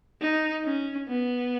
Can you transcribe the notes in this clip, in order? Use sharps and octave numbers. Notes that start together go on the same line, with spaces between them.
D#4
C#4
B3